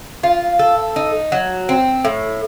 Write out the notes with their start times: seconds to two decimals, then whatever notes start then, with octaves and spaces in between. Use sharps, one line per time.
0.23 F4
0.59 A4
0.96 D#4
1.32 F#3
1.69 C4
2.05 A2